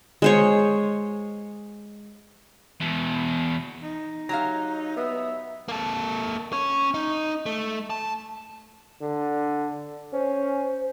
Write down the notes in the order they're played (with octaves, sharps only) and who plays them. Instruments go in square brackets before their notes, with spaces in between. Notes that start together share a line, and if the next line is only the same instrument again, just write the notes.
[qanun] G#3 C5 C#5
[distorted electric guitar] E2 B2
[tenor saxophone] D#4
[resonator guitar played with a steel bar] F#3 G4 F5 [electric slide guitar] A#5
[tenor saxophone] B3 [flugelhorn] E5
[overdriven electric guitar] A#3 A4
C#4 C#5
D#4
A3
A5
[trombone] D3
[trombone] C#4 [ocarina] C5